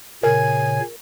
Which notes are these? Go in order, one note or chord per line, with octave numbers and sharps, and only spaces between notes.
A#2 C#3 A#4 C#5 G#5